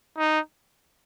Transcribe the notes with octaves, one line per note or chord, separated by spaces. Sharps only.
D#4